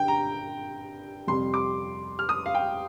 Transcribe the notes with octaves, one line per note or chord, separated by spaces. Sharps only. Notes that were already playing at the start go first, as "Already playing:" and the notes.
Already playing: D3 G5
A#5
F2 C3 G3 C6
D6
F6
D#6
F5
G5